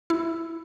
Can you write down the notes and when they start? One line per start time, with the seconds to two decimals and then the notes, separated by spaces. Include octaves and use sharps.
0.10 E4